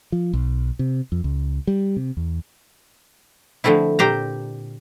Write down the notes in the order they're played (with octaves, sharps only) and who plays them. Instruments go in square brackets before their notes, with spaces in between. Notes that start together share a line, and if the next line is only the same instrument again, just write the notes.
[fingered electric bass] F3
B1
C3
F2
C#2
G3
C3
E2
[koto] D3 F3 A3 C4 E4
A#2 G4 C5 A#5